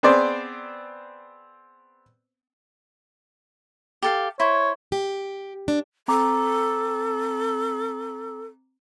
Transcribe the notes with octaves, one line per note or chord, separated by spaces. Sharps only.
B3 C4 G#4 C5 D5
G4 A4 F5
E4 C5 C#5
G4
D4
C4 A4 A#5 D6